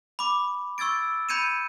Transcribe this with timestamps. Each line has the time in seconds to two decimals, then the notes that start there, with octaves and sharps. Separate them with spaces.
0.19 B5 D6
0.78 C#6 E6 G#6 A6 D7
1.29 B5 G6 G#6 C#7 D#7 E7